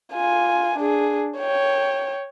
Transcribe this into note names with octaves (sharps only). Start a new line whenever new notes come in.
F4 G#5
D4 G#4
C#5 G5